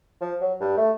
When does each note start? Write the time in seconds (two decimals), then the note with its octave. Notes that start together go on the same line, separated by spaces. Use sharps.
0.21 F3
0.41 F#3
0.61 G2
0.78 A3